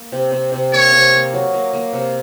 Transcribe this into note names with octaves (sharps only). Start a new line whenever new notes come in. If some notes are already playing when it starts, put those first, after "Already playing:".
Already playing: A#3
C3
C3
C3
A#3 C#5
C3
A#3
F#3
A#3
A#3
C3